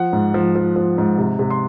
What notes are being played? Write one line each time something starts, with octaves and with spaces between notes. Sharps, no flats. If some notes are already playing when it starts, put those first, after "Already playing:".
Already playing: F3 F#5
G#2
F3
F3
F3
G#2
C3
C3
C6